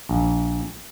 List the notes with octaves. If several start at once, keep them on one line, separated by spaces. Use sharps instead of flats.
A#1